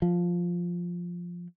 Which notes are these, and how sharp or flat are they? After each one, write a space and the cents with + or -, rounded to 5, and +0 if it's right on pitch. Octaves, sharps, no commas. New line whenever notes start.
F3 +5